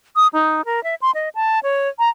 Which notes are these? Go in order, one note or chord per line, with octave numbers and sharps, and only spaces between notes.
D#6
D#4
A#4
E5
C6
D#5
A5
C#5
A#5